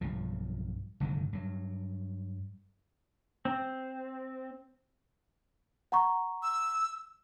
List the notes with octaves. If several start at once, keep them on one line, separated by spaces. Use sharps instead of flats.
B1 G2 F3
F1 G2 D3 D#3
G2 F#3
C4
F#5 A#5 C#6
E6